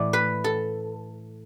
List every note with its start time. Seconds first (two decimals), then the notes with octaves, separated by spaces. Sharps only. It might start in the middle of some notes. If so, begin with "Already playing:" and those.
Already playing: A2 E3 A3 D5
0.13 B4
0.44 A4